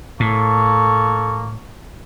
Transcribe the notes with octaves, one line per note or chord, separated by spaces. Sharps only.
A2 A#3 A4 C#6